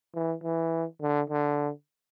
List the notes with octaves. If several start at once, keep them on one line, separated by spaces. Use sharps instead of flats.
E3
E3
D3
D3